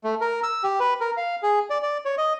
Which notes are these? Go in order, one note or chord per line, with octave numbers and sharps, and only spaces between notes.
A3
A#4
E6
G4
B4
A#4
F5
G#4
D5
D5
C#5
D#5